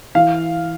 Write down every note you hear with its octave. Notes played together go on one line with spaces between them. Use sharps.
E3 F5